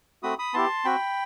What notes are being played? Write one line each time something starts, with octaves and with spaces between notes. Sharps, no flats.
A3 C4 F#4 B5 D#6
B5 D#6
B3 E4 G4 A5 C6
C4 F#4 G5 B5